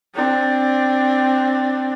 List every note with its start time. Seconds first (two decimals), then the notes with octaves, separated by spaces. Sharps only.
0.15 C4 D4